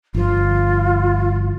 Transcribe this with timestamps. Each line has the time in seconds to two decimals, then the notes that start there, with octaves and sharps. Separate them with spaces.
0.15 G1 F3 F4